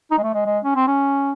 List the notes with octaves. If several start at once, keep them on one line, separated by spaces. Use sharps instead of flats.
D#4
G#3
A3
G#3
G#3
C#4
C4
C#4